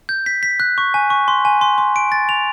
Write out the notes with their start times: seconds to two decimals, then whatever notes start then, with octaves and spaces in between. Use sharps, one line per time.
0.09 G6
0.26 B6
0.43 B6
0.60 F#6
0.78 C#6
0.94 G#5
1.10 C#6
1.28 C6
1.45 G#5
1.61 C6
1.78 C6
1.96 D7
2.12 A6
2.29 F7